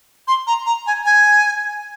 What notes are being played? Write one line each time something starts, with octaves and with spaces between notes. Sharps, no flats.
C6
A#5
A#5
G#5
G#5